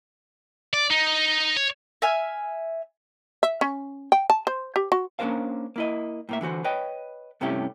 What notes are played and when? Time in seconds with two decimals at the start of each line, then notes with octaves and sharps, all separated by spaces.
0.73 D5
0.90 D#4
1.56 C#5
2.02 E5 G#5 F6
3.43 E5
3.61 C#4
4.12 G5
4.30 A5
4.47 C5
4.76 G4
4.92 F#4
5.19 A#3 C#4 D4 A#4 C5 F5
5.76 A#3 E4 D#5
6.29 A2 A#3 E5
6.41 D3 E3 F#4 C5
6.64 B4 C#5 D#5 G5
7.41 G2 C3 A3 C#4 E4 G4